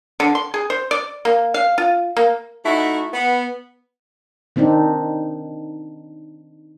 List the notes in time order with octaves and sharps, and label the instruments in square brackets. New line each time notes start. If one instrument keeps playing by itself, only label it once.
[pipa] D3
C6
G#4
C5
D5
A#3
F5
F4
A#3
[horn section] A3 D#4 E4 F#4
B3
[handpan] D#3 C4 D4 D#4